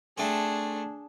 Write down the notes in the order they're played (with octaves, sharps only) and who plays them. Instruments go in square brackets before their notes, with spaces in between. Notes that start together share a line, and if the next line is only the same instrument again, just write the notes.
[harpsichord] A3 C4 [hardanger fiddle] D4 G#4